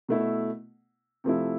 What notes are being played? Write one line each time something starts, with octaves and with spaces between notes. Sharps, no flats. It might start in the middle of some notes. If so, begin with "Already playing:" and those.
B2 A3 E4
C3 F3 A3 E4